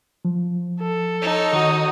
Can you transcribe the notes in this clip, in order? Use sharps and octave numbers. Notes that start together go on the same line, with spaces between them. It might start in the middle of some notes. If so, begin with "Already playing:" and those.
F3
A4
D#4 C#5
D#3 F#4 D#6